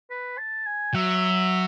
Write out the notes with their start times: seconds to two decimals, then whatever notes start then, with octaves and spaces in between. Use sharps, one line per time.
0.10 B4
0.38 A5
0.67 G#5
0.94 F#3 E5